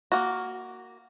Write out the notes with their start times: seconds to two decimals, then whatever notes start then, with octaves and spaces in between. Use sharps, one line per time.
0.12 A#3 F#4